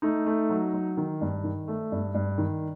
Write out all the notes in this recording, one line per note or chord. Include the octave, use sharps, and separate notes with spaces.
A3 D#4
A3
F#3
F#3
D#3
G2
D#3
A3
G2
G2
D#3